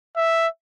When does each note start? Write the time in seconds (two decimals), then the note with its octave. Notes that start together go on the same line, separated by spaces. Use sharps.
0.17 E5